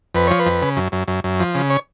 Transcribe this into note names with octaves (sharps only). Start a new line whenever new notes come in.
F2 B4
F3 C#5
B4
F2
C#3
F#2
F#2
F#2
F#2
F3
C#3
C#5